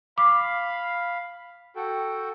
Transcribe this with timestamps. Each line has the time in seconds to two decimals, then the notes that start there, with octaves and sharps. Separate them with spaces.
0.18 F5 B5 D6
1.76 F#4 A4 G5